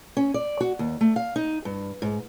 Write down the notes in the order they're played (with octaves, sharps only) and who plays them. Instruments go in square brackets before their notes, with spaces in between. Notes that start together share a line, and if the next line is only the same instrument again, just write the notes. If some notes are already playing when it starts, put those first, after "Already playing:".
[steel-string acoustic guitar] C#4
D5
F#4
D#2
A3
F5
D#4
G2
G#2